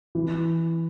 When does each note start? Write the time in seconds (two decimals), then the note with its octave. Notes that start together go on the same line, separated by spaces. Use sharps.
0.15 E3